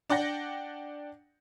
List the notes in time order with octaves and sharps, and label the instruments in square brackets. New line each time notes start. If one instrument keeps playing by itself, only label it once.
[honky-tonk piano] D4 D5 F#5 G5 A#6